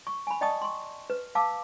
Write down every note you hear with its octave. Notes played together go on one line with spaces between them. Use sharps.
C#6
G#5 B5
D5 D#5 G5 A5 C#6 D#6
C6 C#6
B4
F5 A5 D6 E6